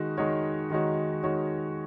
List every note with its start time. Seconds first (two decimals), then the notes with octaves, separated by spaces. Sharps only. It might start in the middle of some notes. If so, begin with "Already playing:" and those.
Already playing: D#3 G#3 D#4 F#4
0.17 D#3 G#3 D#4 F#4 C#5
0.70 D#3 G#3 D#4 F#4 C#5
1.23 D#3 G#3 D#4 F#4 C#5